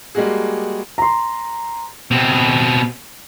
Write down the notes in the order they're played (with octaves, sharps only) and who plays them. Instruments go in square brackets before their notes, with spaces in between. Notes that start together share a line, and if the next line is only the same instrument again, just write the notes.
[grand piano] G3 G#3 A#3 F#4 G#4
[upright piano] A#5 C6
[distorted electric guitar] B2 C4